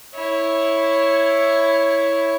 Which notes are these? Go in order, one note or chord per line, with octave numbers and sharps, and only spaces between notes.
E4 C#5